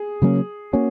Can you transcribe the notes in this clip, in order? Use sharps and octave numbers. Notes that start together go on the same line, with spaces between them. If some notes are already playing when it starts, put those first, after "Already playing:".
Already playing: G#4
C#3 F#3 A#3 C#4
A#3 C#4 F#4